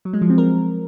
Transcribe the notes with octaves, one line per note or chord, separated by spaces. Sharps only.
F#3
G#3
F3
C4
A#4